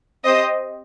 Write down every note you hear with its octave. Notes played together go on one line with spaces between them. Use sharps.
C4 G4 C5 D#5